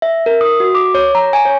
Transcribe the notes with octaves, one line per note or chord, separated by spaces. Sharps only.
E5
A#4
D#6
F#4
D6
C#5
A#5
G#5
C#5